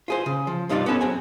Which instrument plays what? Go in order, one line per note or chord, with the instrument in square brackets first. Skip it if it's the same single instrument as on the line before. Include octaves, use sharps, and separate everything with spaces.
[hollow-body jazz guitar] F4 G#4 C5
C#3
F3
G2 C3 D#4 F4 B4 D5
B3 C#4 A4 B4
F#2 C4 G#4 G#5